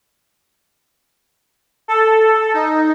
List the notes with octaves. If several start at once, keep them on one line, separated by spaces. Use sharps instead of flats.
A4
D#4